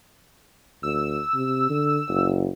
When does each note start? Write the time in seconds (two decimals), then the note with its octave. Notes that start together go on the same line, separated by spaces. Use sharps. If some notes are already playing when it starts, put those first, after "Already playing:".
0.83 D2 E6
1.34 C3
1.70 D3
2.09 F#1